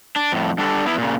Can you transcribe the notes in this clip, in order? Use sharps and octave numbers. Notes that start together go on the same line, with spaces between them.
D4
F2 A2
G3 D4 G4 A4
B3 E4
A#2 C#3